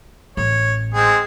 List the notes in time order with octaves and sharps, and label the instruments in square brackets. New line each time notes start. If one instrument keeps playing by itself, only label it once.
[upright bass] A1 [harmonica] C#5
[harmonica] G#3 C4 G#4